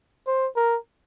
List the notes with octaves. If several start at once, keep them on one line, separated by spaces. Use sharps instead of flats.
C5
A#4